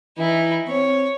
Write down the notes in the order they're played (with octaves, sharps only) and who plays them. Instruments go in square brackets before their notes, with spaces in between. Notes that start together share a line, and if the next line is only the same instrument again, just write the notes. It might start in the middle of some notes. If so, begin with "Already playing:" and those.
[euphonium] E3 [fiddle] D#4 E4
[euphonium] C4 [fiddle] C#5